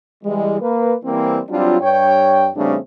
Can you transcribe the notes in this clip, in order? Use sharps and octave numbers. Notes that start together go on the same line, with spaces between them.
E3 G3 G#3
A#3 B4
E3 G3 A#3 C4
F#3 G3 C4 D4 F4
G2 C#5 G5
E2 C#3 G3 A3 C4 D4